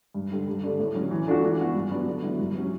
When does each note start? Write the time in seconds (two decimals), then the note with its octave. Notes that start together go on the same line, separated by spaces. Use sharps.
0.14 G2
0.31 D3 G3
0.48 G2
0.64 D3 A3 D4
0.79 A2
0.95 F#3 C#4
1.11 E3
1.27 A3 D4 F#4
1.43 E3
1.59 B3 F#4
1.75 G2
1.90 F#3 B3 D4
2.07 D3
2.23 F#3 B3 E4
2.39 G2
2.55 F#3 C#4 E4